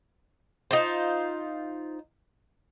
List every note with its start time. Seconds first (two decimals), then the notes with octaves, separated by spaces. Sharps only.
0.71 D#4 F4 C5